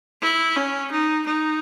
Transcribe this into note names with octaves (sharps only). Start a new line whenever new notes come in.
E4
C#4
D#4
D#4